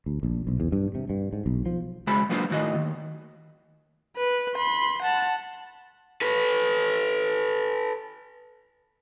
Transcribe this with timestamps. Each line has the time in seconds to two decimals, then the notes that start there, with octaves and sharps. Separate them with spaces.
0.06 D2
0.23 A#1
0.47 B1
0.60 E2
0.72 G2
0.95 C3
1.10 G2
1.33 G#2
1.46 B1
1.66 F3
2.07 C#3 G#3 F#4 C5 B5
2.29 F#3 A#3 B3 D4 F4 C5
2.50 A2 D#3 F#4 D#5
2.75 D#2
4.16 B4
4.56 B5 C6
5.02 F#5 A5
6.21 A4 B4